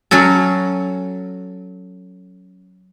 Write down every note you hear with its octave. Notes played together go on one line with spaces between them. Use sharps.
F#3 C#4 F#4 A4